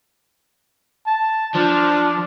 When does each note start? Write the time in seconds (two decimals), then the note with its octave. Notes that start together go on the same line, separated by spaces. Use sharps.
1.06 A5
1.55 F3 D4